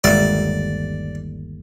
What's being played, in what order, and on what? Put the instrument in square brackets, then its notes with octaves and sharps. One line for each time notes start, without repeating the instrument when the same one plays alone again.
[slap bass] G1 D#2 [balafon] G#3 [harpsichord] D5